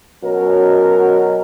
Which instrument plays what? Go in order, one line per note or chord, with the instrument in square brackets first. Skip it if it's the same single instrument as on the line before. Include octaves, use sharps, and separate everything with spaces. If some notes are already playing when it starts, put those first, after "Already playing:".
[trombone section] B2 F#3 C#4 A#4